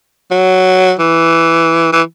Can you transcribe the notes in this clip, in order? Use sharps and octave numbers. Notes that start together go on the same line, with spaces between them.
F#3
E3
E3